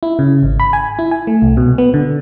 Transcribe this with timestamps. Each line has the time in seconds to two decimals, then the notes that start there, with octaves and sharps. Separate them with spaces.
0.03 E4
0.19 C#3
0.43 G#1
0.60 B5
0.73 G#5
0.99 E4
1.11 G#5
1.27 A3
1.42 C2
1.57 B2
1.78 B3
1.94 D3